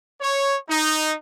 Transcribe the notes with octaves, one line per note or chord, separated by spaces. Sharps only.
C#5
D#4